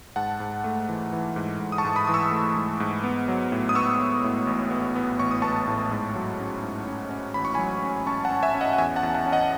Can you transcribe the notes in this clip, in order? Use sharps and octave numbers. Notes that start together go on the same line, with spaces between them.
G#2 F#5 A5
G#2
A3
E3
E3
G#2
G#2
D#6
A5 C#6
G#2
B5 D#6
E3 D#6
C#6 E6
A3
G#2
G#2
B3
F#3
A2
D#6
B3 C#6 E6
B3
A2
A1
B3
B3
A1 C#6
D#6
B3 A5 C#6
A2
G#2
F#3
C#4
G#2
C#4
C#4
A1 B5
C#6
F#3 G#5 B5
C#4
C#4 A5 C#6
F#5 A5
C#4
E5 G#5
C#4
D#5 F#5
F#5
E2 E5 G#5
F#5 A5
E2
F#5 A5
C#4
D#5 F#5